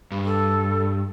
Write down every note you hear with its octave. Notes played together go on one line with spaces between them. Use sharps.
G2
A4